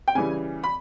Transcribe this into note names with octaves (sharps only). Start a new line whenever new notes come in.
G5
C#3 E3 G3 G#5
B5